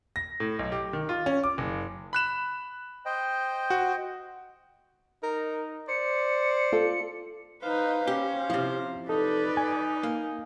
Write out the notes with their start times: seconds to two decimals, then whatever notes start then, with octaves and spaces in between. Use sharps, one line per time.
0.16 A#6
0.40 A2
0.59 B1
0.72 G4
0.93 D#3
1.09 F4
1.26 C#4
1.44 D6
1.58 F#1
2.13 B5 F#6 E7
3.06 C5 D#5 G5
3.70 F#4
5.23 D#4 A#4
5.88 C5 D5 C#7
6.72 F4 A4
7.63 D#4 B4 C5 F5
8.07 C#4 G4
8.50 C3 F3 E4
9.09 D#4 A4 B4 D5
9.57 G#5
10.03 A#3